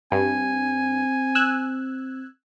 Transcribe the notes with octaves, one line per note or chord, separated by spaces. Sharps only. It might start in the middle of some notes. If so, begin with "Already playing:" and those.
G2 C4 G#5
E6 F#6 G#6